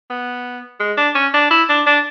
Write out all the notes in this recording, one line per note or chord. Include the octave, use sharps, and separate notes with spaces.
B3
G#3
D4
C#4
D4
E4
D4
D4